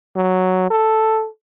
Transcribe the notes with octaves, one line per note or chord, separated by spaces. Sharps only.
F#3
A4